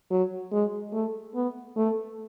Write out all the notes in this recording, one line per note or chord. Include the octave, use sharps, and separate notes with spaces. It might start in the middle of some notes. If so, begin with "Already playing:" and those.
F#3
G#3
A3
B3
A3